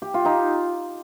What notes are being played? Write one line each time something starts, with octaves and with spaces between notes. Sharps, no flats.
G4
F4
D#4 G4